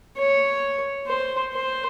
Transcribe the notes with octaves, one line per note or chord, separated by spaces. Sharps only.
C#5
C5
C5